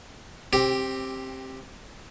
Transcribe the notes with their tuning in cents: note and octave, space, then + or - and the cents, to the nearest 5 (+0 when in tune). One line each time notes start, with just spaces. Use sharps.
C4 +20 G4 +0